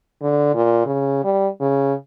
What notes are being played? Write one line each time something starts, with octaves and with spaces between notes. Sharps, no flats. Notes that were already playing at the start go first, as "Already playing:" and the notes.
D3
A#2
C#3
G3
C#3